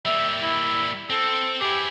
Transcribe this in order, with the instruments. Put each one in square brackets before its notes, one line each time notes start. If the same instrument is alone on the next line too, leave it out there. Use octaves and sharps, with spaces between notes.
[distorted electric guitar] G3 A#3 [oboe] E5
[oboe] E4
[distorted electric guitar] C4 [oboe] A4
[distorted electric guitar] E4 G#4 [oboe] G4